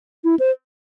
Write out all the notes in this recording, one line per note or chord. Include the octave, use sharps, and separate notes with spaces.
E4
C5